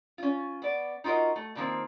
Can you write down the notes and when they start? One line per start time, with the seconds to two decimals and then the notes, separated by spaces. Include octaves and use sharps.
0.18 C#4 F4
0.62 B3 D5
1.04 D#4 F4 F#4 A#4 D#5
1.36 A3
1.55 B2 D3 D#3 F3 A#3 C4